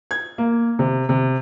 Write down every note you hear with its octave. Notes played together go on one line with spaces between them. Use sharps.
G#6
A#3
C3
C3